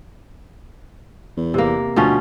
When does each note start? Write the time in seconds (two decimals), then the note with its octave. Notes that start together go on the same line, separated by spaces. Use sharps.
1.37 E2
1.54 C3 A#3
1.96 D2 B2 F3 C#4